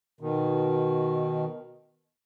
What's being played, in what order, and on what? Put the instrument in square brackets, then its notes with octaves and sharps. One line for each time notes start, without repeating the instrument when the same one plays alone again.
[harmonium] B2 D#3